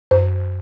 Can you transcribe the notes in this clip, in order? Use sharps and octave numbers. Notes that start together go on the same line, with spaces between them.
F#2 C5